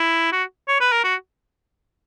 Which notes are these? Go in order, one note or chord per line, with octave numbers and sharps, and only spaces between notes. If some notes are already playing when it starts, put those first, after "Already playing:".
Already playing: E4
F#4
C#5
B4
A#4
F#4